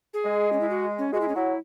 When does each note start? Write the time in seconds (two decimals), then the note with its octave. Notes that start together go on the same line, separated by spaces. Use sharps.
0.14 G#4
0.25 G#3
0.53 C#4
0.60 E4
0.70 F#4
0.98 C#4
1.13 G#3 F#4
1.21 E4
1.28 C#4
1.35 F#3 E4